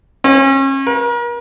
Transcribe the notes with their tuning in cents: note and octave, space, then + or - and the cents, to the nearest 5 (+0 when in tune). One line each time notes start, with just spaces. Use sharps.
C#4 -35
A#4 +40